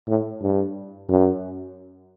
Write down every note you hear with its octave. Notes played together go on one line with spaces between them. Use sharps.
A2
G2
F#2